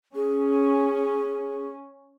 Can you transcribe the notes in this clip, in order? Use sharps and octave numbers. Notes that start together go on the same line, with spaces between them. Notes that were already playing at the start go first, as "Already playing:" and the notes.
C#4 G#4